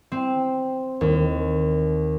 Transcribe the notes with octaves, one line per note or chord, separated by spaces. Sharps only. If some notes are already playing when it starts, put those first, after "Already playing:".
C4
D#2